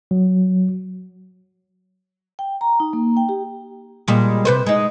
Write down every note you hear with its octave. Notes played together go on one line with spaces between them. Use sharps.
F#3
G5
A#5
D#4
A#3
G5
G4
A#2 G3 G#3
C3 B4 C5
G#3 D#4